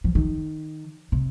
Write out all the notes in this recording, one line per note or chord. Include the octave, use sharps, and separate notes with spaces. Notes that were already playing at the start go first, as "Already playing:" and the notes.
F3
D#3
C3